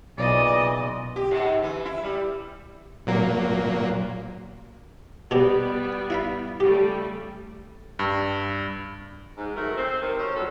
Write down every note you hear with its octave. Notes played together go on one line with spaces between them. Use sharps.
B1 A#2 C#3 E3 D5 D#5
G4
G#2
E3
E4
G3
A#2 F#3 A#3
B2 G3 B3 C4 G4
E4 F5 B5
C#3 G3 A3 G4
G2
G#2
D#3 F#3 A3 A#4
C4
C3 D#3
F#3 C4 C#4 C5
G2 A#2 F#3 A4